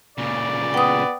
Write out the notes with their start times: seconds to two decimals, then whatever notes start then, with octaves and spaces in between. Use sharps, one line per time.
0.18 A#2 C#3 D5
0.74 B3 G5 D#6